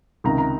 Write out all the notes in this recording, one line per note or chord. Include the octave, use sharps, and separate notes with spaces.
C#2 C3 D#3 A#5
A#5